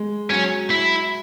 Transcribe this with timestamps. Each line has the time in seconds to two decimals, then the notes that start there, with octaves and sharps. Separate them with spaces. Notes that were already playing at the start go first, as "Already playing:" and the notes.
Already playing: G#3
0.30 F#3 C#4
0.70 E4